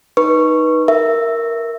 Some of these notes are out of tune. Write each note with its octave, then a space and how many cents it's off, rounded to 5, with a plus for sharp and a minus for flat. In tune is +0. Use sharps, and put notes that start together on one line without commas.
D#4 +0 B4 -20 C#6 -5
A#4 +0 E5 +0